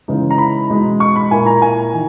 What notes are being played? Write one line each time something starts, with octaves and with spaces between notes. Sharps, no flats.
C#3 E3 G#3 D#4
A#5
B5
B2 G#3 D#4
C#6
B5
A#2 A#3 E4 G#5
A#5
G#5
D#3